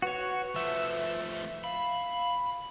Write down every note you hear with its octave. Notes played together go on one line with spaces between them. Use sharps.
F#4 B4 C#5
F3 A3 E5
F5 B5